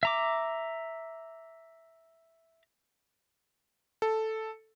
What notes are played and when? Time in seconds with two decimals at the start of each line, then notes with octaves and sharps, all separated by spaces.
0.03 E5 A#5 D6
4.02 A4